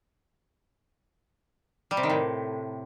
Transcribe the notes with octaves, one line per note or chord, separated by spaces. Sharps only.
G3
C3
D#3
A2